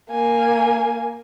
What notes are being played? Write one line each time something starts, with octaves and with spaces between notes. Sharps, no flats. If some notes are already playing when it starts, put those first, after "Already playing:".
A#3 G#5